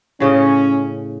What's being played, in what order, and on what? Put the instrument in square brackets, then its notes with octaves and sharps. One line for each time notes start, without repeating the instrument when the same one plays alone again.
[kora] A2 C#3 D#5 [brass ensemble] C#4